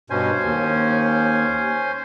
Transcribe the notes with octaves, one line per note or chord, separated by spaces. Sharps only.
G2 B2 C#4 C5 G#5
D#2